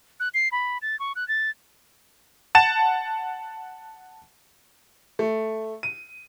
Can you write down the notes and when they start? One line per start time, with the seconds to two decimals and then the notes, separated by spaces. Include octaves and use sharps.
0.20 F#6
0.34 C7
0.52 B5
0.82 A6
1.00 C#6
1.16 F#6
1.28 A6
2.55 F#5 A5 A6 E7
5.19 A3
5.83 D#7